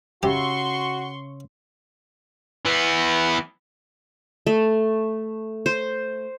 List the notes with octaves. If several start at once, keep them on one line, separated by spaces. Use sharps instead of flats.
C#3 F#4 G4 E5 C6 C#6
E3 B3
A3
C5